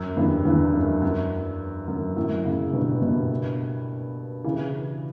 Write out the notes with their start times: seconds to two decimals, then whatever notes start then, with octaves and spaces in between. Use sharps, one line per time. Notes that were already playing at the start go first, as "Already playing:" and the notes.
Already playing: F#2
0.17 E2 G2
0.45 E2 G2
0.74 F#2
1.02 F#2
1.88 F#2
2.16 F#2 A2
2.45 A2 C#3
2.73 G2 B2
3.02 G2 B2
4.44 C#3 E3